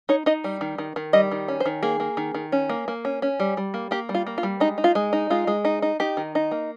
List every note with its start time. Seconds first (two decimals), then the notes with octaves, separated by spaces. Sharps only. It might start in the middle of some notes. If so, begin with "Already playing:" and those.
0.09 D#4 C#5
0.26 D#4 D#5
0.44 G3
0.61 D#3
0.78 D#3
0.96 D#3
1.13 G3 D#5
1.31 D#3
1.48 C#4
1.60 C5
1.66 D#3
1.83 A#3 G#4
2.00 A#3
2.17 D#3
2.35 D#3
2.52 C#4
2.69 A#3
2.88 A#3
3.05 C#4
3.22 C#4
3.40 G3
3.57 G3
3.74 A#3
3.91 A#3 G4
4.09 G3
4.14 F4
4.27 A#3
4.38 F4
4.43 G3
4.60 G#3 D#4
4.78 D#4
4.84 F4
4.95 G#3
5.13 D#4
5.30 G#3 F4
5.47 G#3
5.65 D#4
5.82 D#4
6.00 D#4 G4
6.17 D#3
6.35 D#4
6.51 A#3